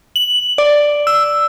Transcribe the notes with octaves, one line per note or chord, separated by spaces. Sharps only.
F#7
D5
E6